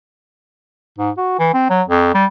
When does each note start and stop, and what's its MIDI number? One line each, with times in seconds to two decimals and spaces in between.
0.98 1.10 44
1.17 1.37 66
1.39 1.50 52
1.53 1.69 60
1.70 1.82 54
1.88 2.10 41
2.14 2.26 55